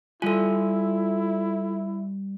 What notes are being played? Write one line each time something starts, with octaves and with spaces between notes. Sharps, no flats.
G3 E4 F4 A4 G#5